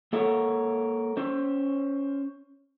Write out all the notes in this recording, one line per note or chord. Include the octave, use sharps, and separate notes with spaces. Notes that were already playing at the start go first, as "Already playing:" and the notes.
A#3 A4 A#4 C#5 E5 F#5
C#4 C5